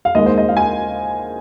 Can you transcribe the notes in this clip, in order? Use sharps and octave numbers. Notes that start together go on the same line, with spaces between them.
F5
D#2 D#3 G#3 D#5
C5
D#5
F5
G#5